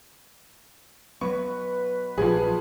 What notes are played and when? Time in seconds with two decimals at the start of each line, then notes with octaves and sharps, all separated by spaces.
1.21 F#3 B3 B4 C#6
2.18 A#1 F3 G#4